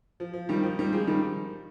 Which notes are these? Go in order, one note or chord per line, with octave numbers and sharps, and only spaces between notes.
F3
F3
D#3 G3
F3
D#3 G3
F3 G#3
D#3 G3